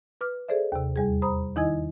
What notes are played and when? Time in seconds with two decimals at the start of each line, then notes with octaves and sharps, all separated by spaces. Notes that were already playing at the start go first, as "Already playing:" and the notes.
0.21 B4 D6 F6
0.48 G#4 A4 C5 D5 E5
0.72 D#2 C3
0.96 E2 G3 G#4
1.22 C5 A#5 B5 D#6
1.56 D#3 D#4 E4 D#5 G#5 G#6